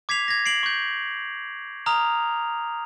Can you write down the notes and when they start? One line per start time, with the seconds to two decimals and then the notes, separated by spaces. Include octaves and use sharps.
0.09 D6 G#6 B6 C7 F7
0.28 G#6 A#6
0.46 C7 D7 F#7
0.63 C#6 G6
1.86 A#5 D#6 F6 F7